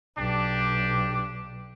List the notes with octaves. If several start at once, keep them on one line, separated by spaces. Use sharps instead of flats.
B1 D4 G4